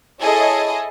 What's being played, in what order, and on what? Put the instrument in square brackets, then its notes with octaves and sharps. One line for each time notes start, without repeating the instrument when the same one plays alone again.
[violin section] E4 G#4 A4 C#5 D#5